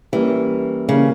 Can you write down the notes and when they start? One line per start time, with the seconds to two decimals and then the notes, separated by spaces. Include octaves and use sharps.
0.13 E3 G3 A#3 C#4
0.88 C#3 G3 A#3 C#4